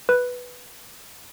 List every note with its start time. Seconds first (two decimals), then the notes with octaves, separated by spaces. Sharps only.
0.09 B4